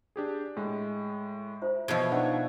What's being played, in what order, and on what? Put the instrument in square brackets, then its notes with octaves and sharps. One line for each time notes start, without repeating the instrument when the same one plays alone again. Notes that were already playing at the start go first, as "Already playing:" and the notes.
[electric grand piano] D4 G4 G#4
A2 G#3
[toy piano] F4 C5 E5
[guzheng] B2 F3 [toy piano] G4 C5 [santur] C#5 E5
[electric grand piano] D4 D#4 [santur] F#5 C#6